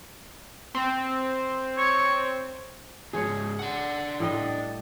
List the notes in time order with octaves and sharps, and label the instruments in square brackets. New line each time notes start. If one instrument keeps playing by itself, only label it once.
[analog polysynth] C4
[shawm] C#5
[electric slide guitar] G#2 C#3 [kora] G#4 C#5
[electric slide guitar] D4 F#5
[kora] A2 G3 D#5